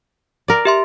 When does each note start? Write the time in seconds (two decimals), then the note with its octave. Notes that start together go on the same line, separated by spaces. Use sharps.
0.48 A#4 D5
0.65 G4 E5 C6